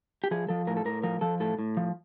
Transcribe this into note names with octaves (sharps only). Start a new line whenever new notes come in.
G4
F3 G#4
F3 A4
A2 A#4
A4
A2 A#4
F3 A#4
F3 A4
A2 A4
A2
F3